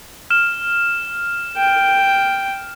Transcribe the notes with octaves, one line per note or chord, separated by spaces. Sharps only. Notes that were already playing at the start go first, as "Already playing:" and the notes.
F6 E7
G5